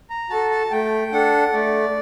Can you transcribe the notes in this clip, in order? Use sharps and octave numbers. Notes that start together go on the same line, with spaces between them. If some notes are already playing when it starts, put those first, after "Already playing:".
A#5
F#4 A4 A5
A5
A3 G5
D4 A4 F#5
A3 D5